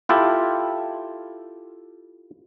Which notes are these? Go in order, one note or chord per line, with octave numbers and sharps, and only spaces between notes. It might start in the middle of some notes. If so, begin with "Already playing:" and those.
E4 F4 G4 A4